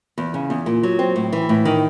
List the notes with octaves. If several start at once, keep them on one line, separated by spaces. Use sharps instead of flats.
E2
C#3
E2
A#2
F#3
C4
A2
E3
A2
D#3